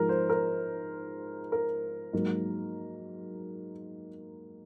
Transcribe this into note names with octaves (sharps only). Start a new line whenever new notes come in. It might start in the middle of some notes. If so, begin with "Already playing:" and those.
Already playing: G#2 F3 G#3 A#4
C5
A#4
A#4
G#2 F#3 A#3